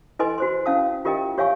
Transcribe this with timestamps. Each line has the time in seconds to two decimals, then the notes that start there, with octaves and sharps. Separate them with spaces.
0.19 E4 A4 B4 D#5 G#5 C6
0.38 F#4 C5 C6
0.66 C#4 E4 F5 A5 D#6
1.05 F4 G4 A#4 D#5 E5 G5
1.38 G4 C#5 E5 F5 G#5 C#6